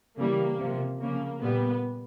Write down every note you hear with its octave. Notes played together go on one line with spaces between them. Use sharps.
C#3 E3 G3 A#3
C3 F3
C#3 F3 A#3
A#2 G3 B3